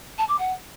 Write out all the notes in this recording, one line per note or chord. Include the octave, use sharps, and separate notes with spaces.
A5
D6
F#5